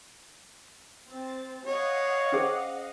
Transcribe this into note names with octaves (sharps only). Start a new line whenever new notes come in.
C4 A6
C#5 D#5 F5 F#5
C#4 G#4 C5